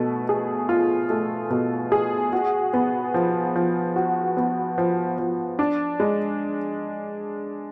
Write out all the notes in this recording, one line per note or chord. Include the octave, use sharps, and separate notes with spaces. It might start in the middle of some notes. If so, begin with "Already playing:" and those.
Already playing: B2 A3
G#4
F4
A3
B2
G#4
F#4
B3
F3
F3
F#4
B3
F3
F3
D4
G#3